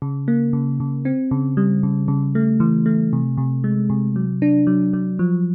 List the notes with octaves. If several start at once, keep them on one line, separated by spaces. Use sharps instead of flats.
C#3
A#3
C#3
C#3
C4
C#3
G3
C#3
C#3
A3
E3
A3
C3
C3
G#3
C3
F#3
D4
F#3
F#3
F3